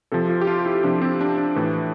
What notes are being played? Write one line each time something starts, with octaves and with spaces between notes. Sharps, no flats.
C3 F3 A4
F4
G4
F4
E4
C3 F3 D4
C4
D4
D4
A2 E3